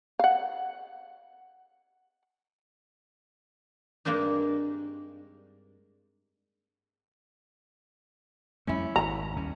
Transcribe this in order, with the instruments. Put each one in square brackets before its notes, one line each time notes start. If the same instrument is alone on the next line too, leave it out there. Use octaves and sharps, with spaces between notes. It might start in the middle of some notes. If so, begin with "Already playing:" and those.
[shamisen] F5 F#5
[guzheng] G2 G#3 A#3 C4 D4 D#4
[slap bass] F2 G3 A3 [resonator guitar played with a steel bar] C#4 E4
[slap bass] G#1 [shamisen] A#5
[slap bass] D#2 G3 C#4